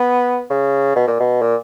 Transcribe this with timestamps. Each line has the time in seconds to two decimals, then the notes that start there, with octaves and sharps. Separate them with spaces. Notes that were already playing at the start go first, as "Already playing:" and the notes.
Already playing: B3
0.50 C#3
0.96 B2
1.08 A#2
1.20 B2
1.41 A#2